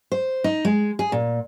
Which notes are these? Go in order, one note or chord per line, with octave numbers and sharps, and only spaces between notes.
C5
D#4
G#3
G#4
A#2